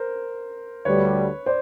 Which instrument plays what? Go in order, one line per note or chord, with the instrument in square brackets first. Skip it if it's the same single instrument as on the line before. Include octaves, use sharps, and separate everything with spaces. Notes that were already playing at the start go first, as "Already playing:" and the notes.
Already playing: [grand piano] A#4 C5
[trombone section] D2 D3 G3 [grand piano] B4 C#5
[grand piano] C5 D5